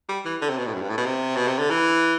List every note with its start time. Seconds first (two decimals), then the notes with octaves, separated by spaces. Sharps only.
0.09 G3
0.25 E3
0.42 D3
0.50 C3
0.58 B2
0.66 A2
0.74 F#2
0.82 G2
0.90 A2
0.98 B2
1.06 C3
1.36 B2
1.47 C3
1.59 D3
1.70 E3